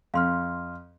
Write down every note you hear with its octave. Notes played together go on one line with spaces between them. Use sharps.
F2 F5 C6 F6